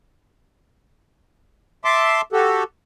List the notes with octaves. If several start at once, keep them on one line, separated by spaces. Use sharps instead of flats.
E5 A5 C6 D6
F#4 G4 A4